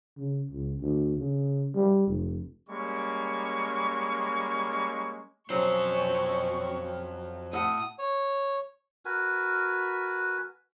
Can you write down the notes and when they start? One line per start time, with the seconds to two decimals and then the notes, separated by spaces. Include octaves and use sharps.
0.17 C#3
0.51 C#2
0.80 D2
1.17 C#3
1.75 G3
2.07 F1
2.69 G3 G#3 A#3 C#4 C#6
5.50 F2 B2 F#3 C4 C#4 C5 C#6
7.53 A2 F#5 D#6
7.99 C#5
9.05 F#4 A#4 B4 G#5